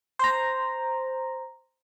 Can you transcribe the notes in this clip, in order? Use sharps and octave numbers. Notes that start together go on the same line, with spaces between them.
C5 A#5